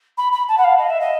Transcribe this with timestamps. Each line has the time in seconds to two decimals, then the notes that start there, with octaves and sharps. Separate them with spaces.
0.17 B5
0.32 B5
0.48 A5
0.57 F#5
0.64 F5
0.78 D#5
0.89 E5
1.00 D#5